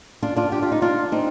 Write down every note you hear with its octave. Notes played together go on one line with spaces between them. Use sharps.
D4 F4
D4 F4
G4
F4
D#4
D4 F4
C4 D#4